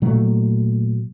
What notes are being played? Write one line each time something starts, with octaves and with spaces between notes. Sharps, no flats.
A#2 F#3 A3